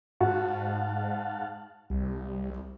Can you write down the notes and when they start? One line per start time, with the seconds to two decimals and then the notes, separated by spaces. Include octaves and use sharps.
0.21 G#2 F#4 F5 F#5 A5
1.90 C2 G3